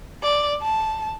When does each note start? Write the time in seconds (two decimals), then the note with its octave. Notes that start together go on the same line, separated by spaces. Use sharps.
0.23 D5
0.62 A5